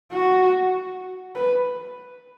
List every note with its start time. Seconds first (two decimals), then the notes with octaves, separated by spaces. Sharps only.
0.12 F#4
1.36 B4